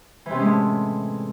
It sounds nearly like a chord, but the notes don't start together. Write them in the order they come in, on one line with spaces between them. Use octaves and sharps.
E3 C3 C#4 G#3 A2